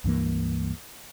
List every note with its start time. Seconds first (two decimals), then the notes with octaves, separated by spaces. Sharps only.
0.04 C#2 G2 E3 A#3